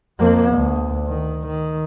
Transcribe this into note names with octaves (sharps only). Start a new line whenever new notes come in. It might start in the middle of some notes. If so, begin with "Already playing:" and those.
F2 A#3
D2
D#3
D#3